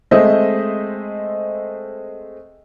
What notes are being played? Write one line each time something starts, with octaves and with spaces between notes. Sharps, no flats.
G#3 A3 C4 C5 D#5 E5